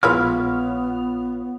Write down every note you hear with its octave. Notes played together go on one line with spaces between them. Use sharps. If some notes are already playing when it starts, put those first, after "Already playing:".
A#1 G#3 B3 E4 F4 B4 C#5 F6